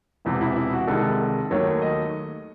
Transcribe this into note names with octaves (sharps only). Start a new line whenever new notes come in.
E1 E2 C3 E4
E4
E4
F#4
C2 C3 D#3 G#3 A4
D#2 D#3 F#3 A3 C#5
D#5